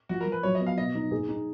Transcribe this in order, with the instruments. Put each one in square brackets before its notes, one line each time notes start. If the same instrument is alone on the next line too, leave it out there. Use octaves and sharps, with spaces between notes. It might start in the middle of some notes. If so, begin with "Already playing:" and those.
[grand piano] F3 [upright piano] F#4
[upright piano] A#4
[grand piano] F3
[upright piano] B4
[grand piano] F#3 [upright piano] C#5
[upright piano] D#5
[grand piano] B3
[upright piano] F5
[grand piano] B2 [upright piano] D#5
[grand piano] D#4
G#4
D#4